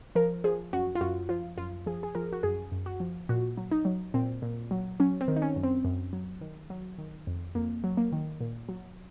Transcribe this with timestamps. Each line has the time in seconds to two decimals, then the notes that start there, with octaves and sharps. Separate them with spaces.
0.15 F3 A#4
0.44 F3 G#4
0.73 F#2 F#4
0.95 F4
1.01 F#2 F#4
1.29 F3 F4
1.58 F#2 F4
1.86 F3 G#4
2.03 G#4
2.15 F3 A#4
2.33 F#4
2.43 F#2 G#4
2.72 F#2
2.86 F#4
3.00 F3
3.29 A#2 F#4
3.58 F#3
3.71 D#4
3.85 F#3
4.14 A#2 C4
4.42 A#2
4.71 F#3
5.00 F#3 C#4
5.21 C4
5.28 D#3
5.36 D#4
5.42 C#4
5.56 F#2
5.63 C4
5.85 F#2
6.13 F#3
6.41 D#3
6.70 F#3
6.98 D#3
7.27 F2
7.55 F2 A#3
7.84 F#3
7.97 A#3
8.12 D#3
8.41 A#2
8.69 F#3